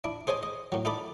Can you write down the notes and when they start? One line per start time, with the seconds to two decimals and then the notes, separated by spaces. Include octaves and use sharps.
0.04 D4 E4
0.27 G#4 C5 C#5 D#5 G#5
0.43 D#5
0.72 A2 F#3
0.85 D#4 E4 A4 D5 B5